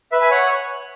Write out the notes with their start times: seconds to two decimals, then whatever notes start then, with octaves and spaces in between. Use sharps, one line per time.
0.12 B4 E5
0.21 G#5
0.31 C#5 F#5